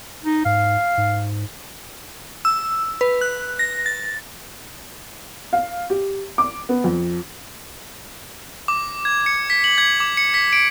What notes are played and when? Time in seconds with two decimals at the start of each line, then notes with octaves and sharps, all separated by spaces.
0.24 D#4
0.45 G#2 F5
0.98 G#2
2.45 E6
3.01 B4
3.21 F#6
3.59 A#6
3.86 A6
5.53 F5
5.90 G4
6.38 D6
6.69 B3
6.84 F2
8.68 D6
9.05 G#6
9.26 C#7
9.50 B6
9.64 F#7
9.78 G#6
10.00 D6
10.17 C#7
10.34 B6
10.53 D7